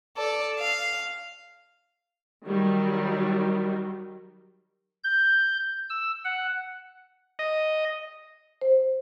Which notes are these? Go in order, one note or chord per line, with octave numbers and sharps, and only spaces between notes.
A4 D5
F5
D#3 F#3 G3
G6
E6
F#5
D#5
C5